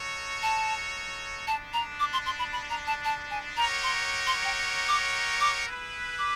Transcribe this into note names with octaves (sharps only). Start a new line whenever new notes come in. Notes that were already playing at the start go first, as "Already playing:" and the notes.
Already playing: D#4 F#4 A4 C#5
A5
G#3 B3 D4 A5
A#5
D6
C6
C6
B5
B5
A#5
A5
A5
G#5
D#4 G4 A#4 C#5 F#5 A#5
C6
C6
G5
D6
D6
E4 G#4 B4
D6